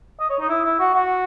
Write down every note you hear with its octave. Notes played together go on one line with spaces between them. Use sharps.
D#5
C#5
D#4
E4
E4
F#4
F#4